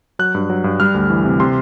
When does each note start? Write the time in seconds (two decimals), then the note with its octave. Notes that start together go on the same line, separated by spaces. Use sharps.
0.19 F#3 F#6
0.35 G2
0.50 F#3
0.64 G2
0.80 G3 F6
0.94 D2
1.10 E3
1.25 C3
1.40 C3 C6